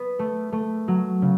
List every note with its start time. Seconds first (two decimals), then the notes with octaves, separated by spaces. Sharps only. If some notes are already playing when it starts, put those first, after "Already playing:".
Already playing: B3
0.19 A3
0.52 A3
0.88 F#3
1.22 C#3